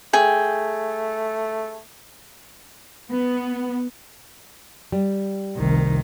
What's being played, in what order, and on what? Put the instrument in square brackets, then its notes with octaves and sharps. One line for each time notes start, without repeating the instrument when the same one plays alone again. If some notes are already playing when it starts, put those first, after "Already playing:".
[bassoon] A3 [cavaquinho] G#4 G5
[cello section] B3
[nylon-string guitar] G3
[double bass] F1 C2 [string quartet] D#3